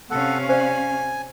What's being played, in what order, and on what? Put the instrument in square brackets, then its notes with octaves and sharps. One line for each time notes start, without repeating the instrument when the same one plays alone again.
[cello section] C3 C#4 F5 [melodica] A4 F#5
[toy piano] C5 D5 [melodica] G#5